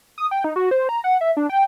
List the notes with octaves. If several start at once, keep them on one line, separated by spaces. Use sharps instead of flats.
D#6
G5
D#4
F#4
C5
A#5
F#5
E5
D4
G5